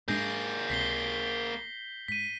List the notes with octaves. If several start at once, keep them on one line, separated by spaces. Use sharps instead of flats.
G#2 G#3 A#3 D4 G#4 G6 A#6
C#2 C3 B6 C7 G7
G#2 B6 D#7